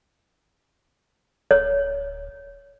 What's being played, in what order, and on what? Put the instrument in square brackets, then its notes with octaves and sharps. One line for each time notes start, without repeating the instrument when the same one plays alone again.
[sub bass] D1 [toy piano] C#5